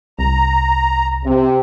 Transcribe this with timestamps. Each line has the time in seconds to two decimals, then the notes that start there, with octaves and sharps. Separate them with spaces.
0.19 C2 A#5
1.25 C3